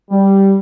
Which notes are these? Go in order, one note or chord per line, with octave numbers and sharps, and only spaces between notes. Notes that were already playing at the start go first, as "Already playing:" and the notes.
G3